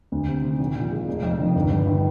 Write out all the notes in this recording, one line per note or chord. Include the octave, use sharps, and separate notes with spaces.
D2
C3
D#3
A#1
A#2
G#3
F1
F2
D#3
G1
G2
D#3